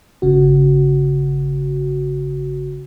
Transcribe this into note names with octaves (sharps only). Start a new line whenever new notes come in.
G1 C#3 F#4